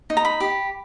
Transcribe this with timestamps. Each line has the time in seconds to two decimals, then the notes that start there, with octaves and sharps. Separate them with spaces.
0.10 D#4
0.17 A#5
0.25 B5
0.40 G4